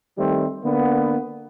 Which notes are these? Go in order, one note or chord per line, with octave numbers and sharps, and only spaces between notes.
D#3 G3 A3 C4
D3 A#3 B3